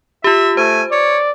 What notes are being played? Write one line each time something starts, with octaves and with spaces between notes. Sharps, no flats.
F4 G4 E5
A3 C5 G#5
C#5 D5